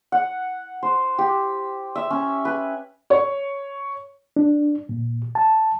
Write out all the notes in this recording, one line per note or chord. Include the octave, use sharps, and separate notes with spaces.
F#5
C5
G4
E5
C#4
B4
C#5
D4
A#2
A5